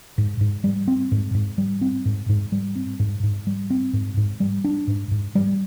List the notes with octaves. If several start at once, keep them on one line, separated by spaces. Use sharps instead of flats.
G#2
G#2
G3
C4
G#2
G#2
G3
C4
G#2
G#2
G3
C4
G#2
G#2
G3
C4
G#2
G#2
G3
D4
G#2
G#2
G3